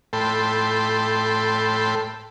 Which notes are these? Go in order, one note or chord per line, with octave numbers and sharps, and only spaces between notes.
A2 A4 G5 B5 C6